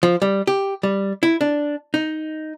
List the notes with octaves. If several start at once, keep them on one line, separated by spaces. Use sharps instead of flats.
F3
G3
G4
G3
E4
D4
D#4